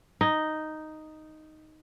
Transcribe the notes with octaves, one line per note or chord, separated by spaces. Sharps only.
D#4